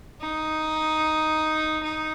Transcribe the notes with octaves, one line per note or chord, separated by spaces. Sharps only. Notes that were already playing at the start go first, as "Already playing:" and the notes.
D#4
D#4